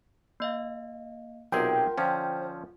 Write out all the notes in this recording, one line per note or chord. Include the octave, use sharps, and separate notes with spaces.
A#3 D#5 F5
B1 C3 F4 G#4 A#4 F#5 G5 C6
D3 F3 C#4 C5